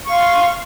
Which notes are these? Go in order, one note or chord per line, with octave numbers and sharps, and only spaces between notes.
F5 C6 C#6